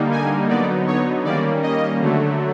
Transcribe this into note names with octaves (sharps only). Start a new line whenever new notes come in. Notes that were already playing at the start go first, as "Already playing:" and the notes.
Already playing: D3 G3 A#3 D#4
G#5
D3 F#3 B3 D#4 D5
C#5
D#3 G3 A#3 C#4 D5
D#5
D3 F#3 A3